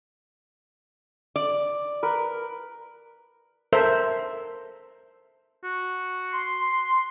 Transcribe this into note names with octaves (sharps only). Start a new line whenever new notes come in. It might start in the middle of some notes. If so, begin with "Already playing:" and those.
D5
A#4 B4
A4 A#4 C5 E5
F#4
C6